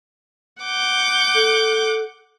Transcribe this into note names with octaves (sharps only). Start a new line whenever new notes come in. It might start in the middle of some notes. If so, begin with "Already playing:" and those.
F#5 D6 G6
A4